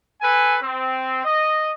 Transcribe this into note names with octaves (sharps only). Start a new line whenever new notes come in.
A4 B4 G#5
C4
D#5